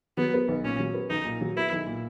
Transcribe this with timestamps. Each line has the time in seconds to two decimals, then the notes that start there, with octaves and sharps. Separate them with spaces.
0.17 F#3 B3
0.34 B3
0.48 B1
0.64 A#2 C#4
0.79 F#3
0.94 B3
1.10 B1 D#4
1.25 A#2
1.41 F#3
1.56 B3 E4
1.72 B1
1.87 A#2